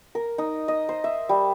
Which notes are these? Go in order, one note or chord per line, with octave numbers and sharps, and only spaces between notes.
A#4
D#4
D#5
C5
E5
G3